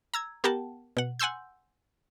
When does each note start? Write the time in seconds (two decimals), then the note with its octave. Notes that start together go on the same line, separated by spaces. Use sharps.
0.14 A#5 E6 G#6
0.44 B3 G4 A#4 F#5 G5 A5
0.97 B2 F#5
1.19 F#5 G#5 C6 E6 G6